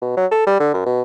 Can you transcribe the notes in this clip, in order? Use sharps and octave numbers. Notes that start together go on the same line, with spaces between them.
B2
F#3
A4
G3
D3
F#2
B2